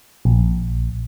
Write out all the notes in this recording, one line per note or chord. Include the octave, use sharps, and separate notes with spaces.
A#1